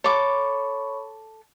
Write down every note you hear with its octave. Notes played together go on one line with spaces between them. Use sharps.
A4 C#5 B5 C#6 D6